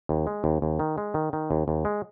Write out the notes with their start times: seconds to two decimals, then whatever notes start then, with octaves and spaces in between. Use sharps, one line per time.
0.09 D#2
0.27 G#3
0.44 D#2
0.62 D#2
0.79 D#3
0.98 G#3
1.14 D#3
1.33 D#3
1.51 D#2
1.68 D#2
1.85 G#3